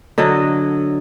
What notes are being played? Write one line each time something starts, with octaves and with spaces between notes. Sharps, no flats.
D3 F#3 D#5